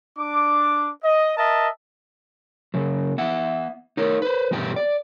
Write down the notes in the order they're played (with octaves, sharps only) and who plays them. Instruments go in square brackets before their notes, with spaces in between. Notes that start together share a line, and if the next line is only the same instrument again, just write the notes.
[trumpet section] D4 D6
D#5
A#4 D#5 E5 A5
[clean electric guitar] C#3 F#3
B3 E5 F#5
D#4 A#4 C#5
B4 C5
E2 G2 B2 G4 G5
D5